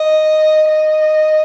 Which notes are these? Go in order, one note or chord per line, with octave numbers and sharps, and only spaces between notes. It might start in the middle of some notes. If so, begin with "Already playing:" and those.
Already playing: D#5
D#5